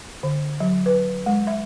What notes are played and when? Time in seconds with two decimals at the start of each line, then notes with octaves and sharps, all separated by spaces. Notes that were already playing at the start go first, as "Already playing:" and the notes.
0.23 D3
0.60 F#3
0.86 B4
1.26 G#3
1.47 E5